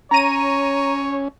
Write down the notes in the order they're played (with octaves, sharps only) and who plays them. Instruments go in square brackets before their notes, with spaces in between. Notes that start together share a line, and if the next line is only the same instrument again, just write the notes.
[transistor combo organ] C#4 [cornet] C#5 [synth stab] A#5 D#7